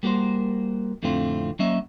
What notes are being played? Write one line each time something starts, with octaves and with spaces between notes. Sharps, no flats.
G3 A#3 F#4 A#4 C5
F2 A2 D3 A3 C4 F4
F#3 A#3 C#4 D#5 E5